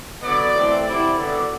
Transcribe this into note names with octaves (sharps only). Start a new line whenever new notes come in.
D3 F#3 B3 D5
E3 A3 C4
C3 F#3 C4 E4 D5
D3 F#3 B3 D5